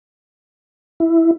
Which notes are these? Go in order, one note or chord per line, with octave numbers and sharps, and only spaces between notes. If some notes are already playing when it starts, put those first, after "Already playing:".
E4